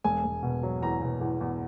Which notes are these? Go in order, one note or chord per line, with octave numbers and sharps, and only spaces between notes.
E1 G#5
E1
B2
F#3
E2 A#5
B2
E2
E2